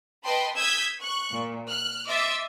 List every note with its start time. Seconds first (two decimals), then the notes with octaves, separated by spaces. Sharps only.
0.24 B4 D#5 G5 A5 B5 C6
0.56 D#6 E6 G6 G#6 B6
1.00 C#6 F#6
1.32 A#2
1.67 F6 F#6
2.08 D#5 E5 C6 D6 E6 A6